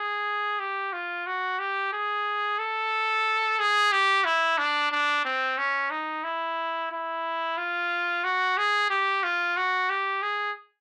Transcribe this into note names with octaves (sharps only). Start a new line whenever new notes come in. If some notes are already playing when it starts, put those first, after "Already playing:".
Already playing: G#4
G4
F4
F#4
G4
G#4
A4
G#4
G4
E4
D4
D4
C4
C#4
D#4
E4
E4
F4
F#4
G#4
G4
F4
F#4
G4
G#4